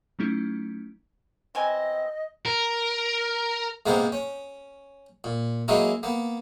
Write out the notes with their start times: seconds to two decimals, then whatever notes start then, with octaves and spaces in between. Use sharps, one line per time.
0.19 F#3 A3 C#4 D#4 E4
1.55 E3 C4 D#5 G#5
2.46 A#4
3.86 G#2 C3 A#3 B3 A#4 C5
4.12 C#4
5.24 A#2
5.68 F#3 G#3 A#3 C#4 D#4 E4
6.03 A#3 B3